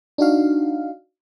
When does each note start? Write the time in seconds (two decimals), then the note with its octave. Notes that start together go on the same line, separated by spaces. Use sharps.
0.18 D4 D#4 F#4 F5